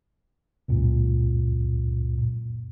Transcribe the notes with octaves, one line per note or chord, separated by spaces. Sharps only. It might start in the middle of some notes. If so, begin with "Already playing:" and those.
C#2 F#2 A#2